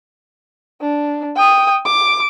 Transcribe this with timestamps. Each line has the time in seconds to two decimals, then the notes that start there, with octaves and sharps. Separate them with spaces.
0.81 D4
1.36 G5 D#6
1.86 D6